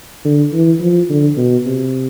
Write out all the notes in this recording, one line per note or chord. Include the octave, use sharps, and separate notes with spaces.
D3
E3
F3
D3
B2
C3